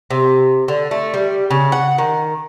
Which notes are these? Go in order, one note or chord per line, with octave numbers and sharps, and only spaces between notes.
C3
D3
A3
G3
C#3
F#5
D#3